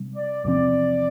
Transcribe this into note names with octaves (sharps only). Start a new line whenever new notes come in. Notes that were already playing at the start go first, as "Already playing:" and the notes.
Already playing: C3 G3
D5
E2 C3 F3 C4 D5